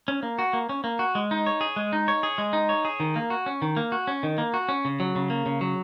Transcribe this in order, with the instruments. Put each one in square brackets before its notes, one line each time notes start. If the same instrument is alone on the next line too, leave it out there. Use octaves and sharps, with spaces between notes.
[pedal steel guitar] C#4
A#3
F#4
A#3
C#4
A#3
F#4
G#3
D#4
C#5
G#4
G#3
D#4
C#5
G#4
G#3
D#4
C#5
G#4
D#3
A#3
F#4
C#4
D#3
A#3
F#4
C#4
D#3
A#3
F#4
C#4
C#3
F#3
C#3
A#3
C#3
F#3